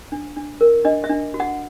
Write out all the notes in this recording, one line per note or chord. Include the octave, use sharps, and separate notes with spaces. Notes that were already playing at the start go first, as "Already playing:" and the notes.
D4
D4
A#4
D4 D#5
E5
D4
F#4
F#5